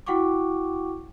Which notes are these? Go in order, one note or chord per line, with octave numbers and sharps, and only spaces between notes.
E4 F#4 F#5 G5 C#6 D6